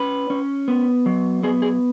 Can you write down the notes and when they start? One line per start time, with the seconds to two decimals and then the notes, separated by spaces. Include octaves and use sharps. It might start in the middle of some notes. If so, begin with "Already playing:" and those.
Already playing: C#4 B4
0.30 C#4
0.68 B3
1.06 F#3
1.43 B3 G#4
1.62 G#4